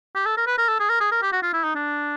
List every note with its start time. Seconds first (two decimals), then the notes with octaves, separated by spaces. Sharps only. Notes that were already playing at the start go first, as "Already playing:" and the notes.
0.15 G4
0.26 A4
0.37 A#4
0.47 B4
0.58 A#4
0.69 A4
0.80 G#4
0.90 A#4
1.00 G#4
1.11 A#4
1.22 G4
1.32 F#4
1.42 F4
1.54 E4
1.64 D#4
1.75 D4